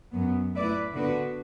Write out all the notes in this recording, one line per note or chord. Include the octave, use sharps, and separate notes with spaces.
F#2 F#3 B3
A2 A3 E4 B4 D5
D3 B3 D4 F#4 B4